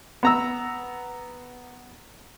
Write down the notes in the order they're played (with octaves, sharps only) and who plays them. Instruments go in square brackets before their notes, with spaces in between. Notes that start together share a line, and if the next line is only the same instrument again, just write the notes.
[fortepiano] B3 A#5 E6